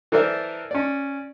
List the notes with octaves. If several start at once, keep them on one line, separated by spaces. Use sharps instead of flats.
E3 A4 A#4 C5 D5 E5
C#4 D5